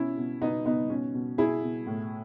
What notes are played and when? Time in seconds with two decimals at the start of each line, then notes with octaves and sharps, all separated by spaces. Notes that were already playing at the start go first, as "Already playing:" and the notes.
Already playing: B2 C#4 E4
0.17 B2
0.42 B2 B3 D#4
0.66 B2 B3 D#4
0.90 B2 C#4
1.14 B2
1.38 B2 E4 G#4
1.63 B2
1.87 A2